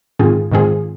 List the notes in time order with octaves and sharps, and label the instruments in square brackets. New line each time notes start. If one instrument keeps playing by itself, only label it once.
[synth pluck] G#2 D#3 C4 F4 G#4
G#2 D#3 C4 F4 G#4